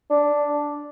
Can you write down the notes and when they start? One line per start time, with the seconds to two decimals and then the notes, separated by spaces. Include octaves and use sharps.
0.10 D4